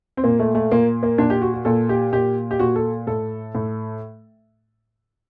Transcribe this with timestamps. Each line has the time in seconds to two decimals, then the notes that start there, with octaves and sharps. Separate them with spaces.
0.17 C4
0.24 A#2 A#3
0.40 A3
0.55 A3
0.71 A#2 A#3
1.03 A#3
1.18 A#2 D4
1.30 G4
1.42 F#4
1.54 F#4
1.65 A#2 A4
1.89 G4
2.13 A#2 G4
2.51 G4
2.59 A#2 F#4
2.76 A4
3.07 A2 A4
3.55 A2